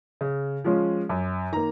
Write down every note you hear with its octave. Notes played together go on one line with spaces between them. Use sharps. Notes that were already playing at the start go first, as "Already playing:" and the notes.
C#3
F3 G#3 C#4 F4
F#2
D#3 A#3 A#5